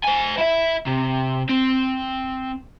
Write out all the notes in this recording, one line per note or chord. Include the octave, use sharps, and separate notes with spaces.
C5 G#5
E4 E5
C3
C4